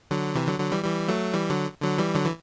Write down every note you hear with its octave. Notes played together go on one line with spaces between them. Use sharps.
D3 F#3
C3 E3
D3 F#3
D3 F#3
E3 G3
E3 G3
F#3 A3
E3 G3
D3 F#3
D3 F#3
E3 G3
D3 F#3
E3